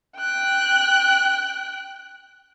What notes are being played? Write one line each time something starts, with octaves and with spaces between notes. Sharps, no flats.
G5 F#6